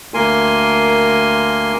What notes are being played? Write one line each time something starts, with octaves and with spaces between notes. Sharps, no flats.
D2 A#3 A#4 G#5 C6